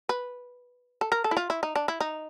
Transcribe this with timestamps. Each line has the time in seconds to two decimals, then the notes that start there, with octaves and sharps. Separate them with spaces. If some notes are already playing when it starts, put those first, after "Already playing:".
0.09 B4
1.01 A4
1.12 A#4
1.24 A4
1.31 E4
1.37 F4
1.50 E4
1.63 D#4
1.75 D4
1.88 E4
2.00 D#4